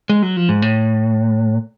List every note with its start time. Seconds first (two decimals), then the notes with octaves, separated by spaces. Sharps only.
0.09 G#3
0.23 F#3
0.37 F3
0.49 G#2
0.62 A2